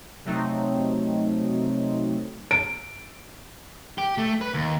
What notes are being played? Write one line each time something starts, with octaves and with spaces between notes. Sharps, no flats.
C3 F#3 A3 C4 D#4
D7
G4
A3
B4
D#2